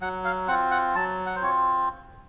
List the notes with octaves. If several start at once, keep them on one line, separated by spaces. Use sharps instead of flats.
F#3 F#5
F5
C4 F4 F#5
F#5
F#3 A5
F#5
C5
C4 F4 C#5